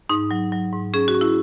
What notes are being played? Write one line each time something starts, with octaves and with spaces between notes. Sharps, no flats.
G#2 D#4
F#3
F#3
G#2
C#4 G#4
F#4
C#4
E4